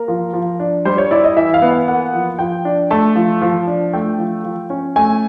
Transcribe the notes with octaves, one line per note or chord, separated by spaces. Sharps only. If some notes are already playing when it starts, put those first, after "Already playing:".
Already playing: A#3 A#4
F3
F3
D4
G3 C5
C#5
E4 D5
D#5
E3 E5
F5
B3
F5
A#3 F#5
F3
F3 G5
D4
A3 A5
F3
F3
D4
A3 G5
F3
F3
C#4
A3 G#5